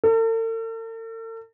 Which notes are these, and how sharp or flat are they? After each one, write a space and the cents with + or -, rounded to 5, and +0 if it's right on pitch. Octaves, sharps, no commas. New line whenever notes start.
A4 +45